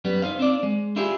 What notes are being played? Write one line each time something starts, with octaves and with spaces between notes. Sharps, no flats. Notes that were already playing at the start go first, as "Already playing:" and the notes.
F#2 G3 B3
D#4 C5 F5
C4 D4 D5
G#3
D4 E4 F4 G4 G#4